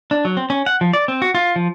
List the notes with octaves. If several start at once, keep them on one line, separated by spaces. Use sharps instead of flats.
D4
F#3
C4
C#4
F#5
F3
D5
C4
F#4
F4
F3